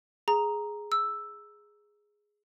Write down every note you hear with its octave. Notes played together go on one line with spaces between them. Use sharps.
G#4 A#5
E6